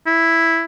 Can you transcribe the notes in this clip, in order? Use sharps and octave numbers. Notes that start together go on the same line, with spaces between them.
E4